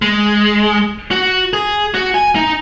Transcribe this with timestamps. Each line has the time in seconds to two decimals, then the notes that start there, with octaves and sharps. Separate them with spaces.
0.02 G#3
1.11 F#4
1.53 G#4
1.95 F#4
2.14 G#5
2.36 D#4